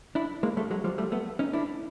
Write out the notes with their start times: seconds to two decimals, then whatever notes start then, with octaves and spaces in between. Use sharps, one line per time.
0.15 D4 E4
0.43 G#3 A#3
0.57 G3 A3
0.70 F#3 G#3
0.84 F3 G3
0.98 G3 A3
1.12 A3 B3
1.39 C#4 D#4
1.53 D4 E4